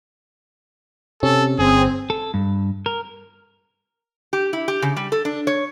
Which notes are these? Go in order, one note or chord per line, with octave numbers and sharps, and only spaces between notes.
C3 C#4 A4
G1 C4 G#4
A4
G2
A#4
G4
E4
G4
C#3
G3
A4
D4
C#5